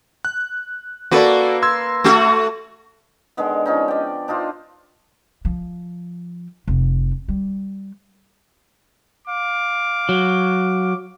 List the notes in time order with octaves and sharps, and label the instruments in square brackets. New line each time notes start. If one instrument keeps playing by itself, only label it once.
[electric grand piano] F#6
[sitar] A#3 B4 [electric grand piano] F#4 A4 D5
[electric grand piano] C6 E6 G#6
[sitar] A3 F#4
[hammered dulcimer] D3 D#3 G#3 B3
F3 C#4 D#4
D5 G5
D4 D#4 F4 C5
[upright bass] F3
F1
G3
[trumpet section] F5 D6
[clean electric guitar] F#3